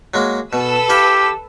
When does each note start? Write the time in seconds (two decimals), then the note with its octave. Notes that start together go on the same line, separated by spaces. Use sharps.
0.14 F#3 G#3 A#3
0.53 B2 A4 B4 E6
0.89 E4 G4 E5 F5